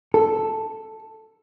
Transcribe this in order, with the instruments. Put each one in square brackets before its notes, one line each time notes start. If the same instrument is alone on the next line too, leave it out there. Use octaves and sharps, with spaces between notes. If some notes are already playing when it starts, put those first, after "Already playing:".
[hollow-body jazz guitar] A4